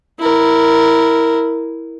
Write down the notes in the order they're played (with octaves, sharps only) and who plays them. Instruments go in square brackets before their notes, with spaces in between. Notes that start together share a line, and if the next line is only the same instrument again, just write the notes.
[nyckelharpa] E4 A#4